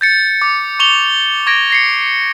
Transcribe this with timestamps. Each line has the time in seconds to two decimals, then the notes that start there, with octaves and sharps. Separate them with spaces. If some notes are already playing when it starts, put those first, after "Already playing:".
0.01 G6 A6 C#7
0.42 D6
0.79 C#6 F7 G7
1.47 C#6 G#6 A#6 D7
1.70 A#6 C7 C#7